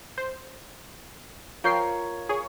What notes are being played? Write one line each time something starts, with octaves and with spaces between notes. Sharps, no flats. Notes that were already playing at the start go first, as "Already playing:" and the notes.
C5
F3 F4 A#4 C#5 G5 C7
G#4 C#5